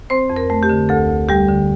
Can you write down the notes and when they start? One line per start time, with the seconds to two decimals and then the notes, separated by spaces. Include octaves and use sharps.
0.10 C4 C5
0.30 F2
0.36 A#4
0.50 A3
0.63 G4
0.69 D3
0.89 D2 A4
1.09 D2
1.29 G3 G4
1.48 D3